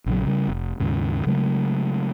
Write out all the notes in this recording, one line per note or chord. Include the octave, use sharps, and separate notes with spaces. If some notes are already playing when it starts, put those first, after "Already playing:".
A#1 C#3 F3 F#3
C#3 G3
F1
D#2 G#2 C#3
C#3 F#3 G#3 A3